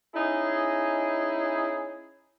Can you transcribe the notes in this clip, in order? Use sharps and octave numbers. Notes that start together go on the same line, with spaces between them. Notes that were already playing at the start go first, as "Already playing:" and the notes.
C#4 D#4 E4 G#4